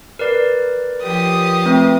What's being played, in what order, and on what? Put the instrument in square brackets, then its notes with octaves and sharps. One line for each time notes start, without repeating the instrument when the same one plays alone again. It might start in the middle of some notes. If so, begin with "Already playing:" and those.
[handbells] A#4 B4 D5
[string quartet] F3 G4 D#6
[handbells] A3 C4 B4